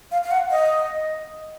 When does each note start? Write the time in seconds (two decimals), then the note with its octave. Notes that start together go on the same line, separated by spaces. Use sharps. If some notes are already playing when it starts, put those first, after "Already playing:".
0.12 F5
0.24 F5
0.31 F#5
0.51 D#5